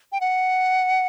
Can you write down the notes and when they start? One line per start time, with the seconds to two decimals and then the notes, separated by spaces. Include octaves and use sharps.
0.12 G5
0.21 F#5